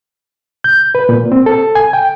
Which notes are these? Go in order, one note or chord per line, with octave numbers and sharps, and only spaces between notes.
G6
B4
A#2
C4
A4
G#5
G5